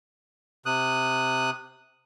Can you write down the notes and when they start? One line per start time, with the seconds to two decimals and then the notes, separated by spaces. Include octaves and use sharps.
0.66 C3 D#6 F#6